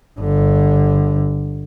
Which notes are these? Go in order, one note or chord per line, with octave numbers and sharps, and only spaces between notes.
G1 D3